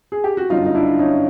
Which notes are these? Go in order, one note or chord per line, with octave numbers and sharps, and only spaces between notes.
G#4
G4
F#4
G1 F#2 D3 D#4 F4
D#4
D4 E4
C#4 D#4